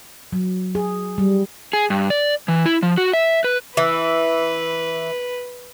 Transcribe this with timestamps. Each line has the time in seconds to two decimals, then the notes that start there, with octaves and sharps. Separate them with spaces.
0.32 F#3
0.75 G#4
1.18 G3
1.73 G#4
1.90 G2
2.10 D5
2.48 E3
2.66 E4
2.83 F3
2.98 F#4
3.13 E5
3.44 B4
3.77 E3 B4